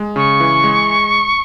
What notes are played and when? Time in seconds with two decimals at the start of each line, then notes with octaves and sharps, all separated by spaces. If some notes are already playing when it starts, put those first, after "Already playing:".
Already playing: G#3
0.16 C#3 C#6
0.40 E3
0.64 G#3